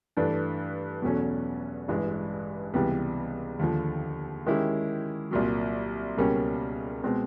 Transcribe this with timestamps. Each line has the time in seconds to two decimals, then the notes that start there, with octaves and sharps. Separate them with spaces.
0.17 G2 E3 A3 D4
1.02 E2 B2 F#3 A3 C#4
1.88 A1 G2 E3 G#3
2.74 C#2 C3 E3 G3 B3
3.59 D#2 D3 F3
4.46 D#3 G#3 C#4 E4 G4
5.31 C2 A#2 F#3
6.17 C#2 B2 G3 A#3 C#4
7.03 B2 G#3 C4